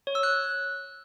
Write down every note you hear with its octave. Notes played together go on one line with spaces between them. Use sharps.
C#5
E6
F#6